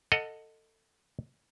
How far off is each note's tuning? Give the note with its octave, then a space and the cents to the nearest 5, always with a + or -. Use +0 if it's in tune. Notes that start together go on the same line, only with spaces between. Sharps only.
A4 +25 D#5 +0 F#5 -20